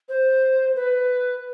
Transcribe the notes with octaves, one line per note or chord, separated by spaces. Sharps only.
C5
B4